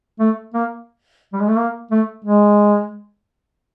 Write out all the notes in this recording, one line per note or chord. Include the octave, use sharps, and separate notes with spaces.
A3
A#3
G3
G#3
A3
A#3
A3
G#3